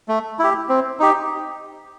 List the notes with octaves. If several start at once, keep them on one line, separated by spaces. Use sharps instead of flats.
A3
E4 G4
C4
D#4 G4